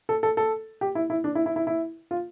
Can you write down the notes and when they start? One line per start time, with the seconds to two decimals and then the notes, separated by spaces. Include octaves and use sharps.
0.09 A4
0.23 A4
0.37 A4
0.81 G4
0.95 E4
1.10 E4
1.24 D4
1.35 E4
1.46 E4
1.56 E4
1.67 E4
2.11 F4